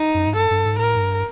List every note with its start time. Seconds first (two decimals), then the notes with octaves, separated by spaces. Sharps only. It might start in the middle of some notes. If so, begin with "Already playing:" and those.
Already playing: D#4
0.14 F#2
0.27 G#2
0.36 G2 A4
0.50 G2
0.65 G#2
0.79 A2 A#4
0.95 G#2
1.01 G2